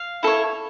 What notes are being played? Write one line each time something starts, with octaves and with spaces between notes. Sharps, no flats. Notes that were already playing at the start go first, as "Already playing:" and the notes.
Already playing: F5
E4 A4 C#5